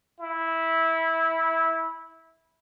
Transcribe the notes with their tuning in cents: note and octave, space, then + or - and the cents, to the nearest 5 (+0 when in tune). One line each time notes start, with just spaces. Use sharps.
E4 -15